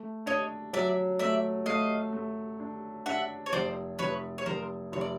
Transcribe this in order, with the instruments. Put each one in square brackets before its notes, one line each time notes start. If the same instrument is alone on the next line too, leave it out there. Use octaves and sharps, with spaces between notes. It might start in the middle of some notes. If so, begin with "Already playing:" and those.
Already playing: [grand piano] A3
[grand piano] D4 [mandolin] C#5 D#5
[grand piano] F#3 [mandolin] D5 E5
[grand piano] A3 [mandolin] D5 E5
[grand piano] A3 [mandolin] D#5 F5
[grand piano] A3
D4
[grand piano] D4 [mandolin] E5 F#5
[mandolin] C#5
[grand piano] F1 [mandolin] C5 D5
[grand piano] F1 [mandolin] B4 C#5
[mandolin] C#5
[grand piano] F1 [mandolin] A#4 C5
[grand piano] F1 [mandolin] C#5
[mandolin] D5